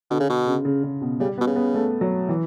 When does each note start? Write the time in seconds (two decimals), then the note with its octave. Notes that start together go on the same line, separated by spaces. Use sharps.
0.10 B2 D3
0.20 C#3
0.29 B2
0.47 C#3
0.65 C#3
0.83 C#3
1.02 B2
1.20 C#3 G3
1.38 B3
1.41 B2
1.47 C#3
1.55 B3
1.74 A3
2.01 F#3
2.29 E3